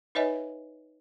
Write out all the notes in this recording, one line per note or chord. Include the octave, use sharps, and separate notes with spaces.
D#4 B4 C#5 D#5 E5 G#5